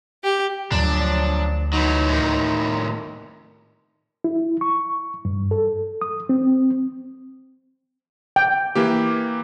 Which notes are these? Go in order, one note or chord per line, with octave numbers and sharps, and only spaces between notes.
G4
D2 A#2 F3 F#3 D4
E3 F#3 D#4
A2 D#3
E4
C#6
G2
A4
D#6
C4
G5
E3 A#3 G4